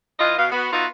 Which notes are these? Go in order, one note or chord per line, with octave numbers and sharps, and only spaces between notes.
E3 F4 D#5
B2 F5
B3 F#4
B3 D#4 F4 F#4 B4 E5